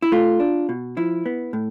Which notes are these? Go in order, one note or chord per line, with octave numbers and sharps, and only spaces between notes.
E4
A3 F4
D4
B2
F3 E4
B3
A2